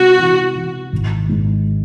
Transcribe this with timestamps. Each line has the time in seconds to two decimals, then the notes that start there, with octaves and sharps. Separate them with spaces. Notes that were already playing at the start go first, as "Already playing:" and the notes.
Already playing: C3 G#3 F#4
0.19 E3
0.55 E3
0.92 G#1
1.29 G#2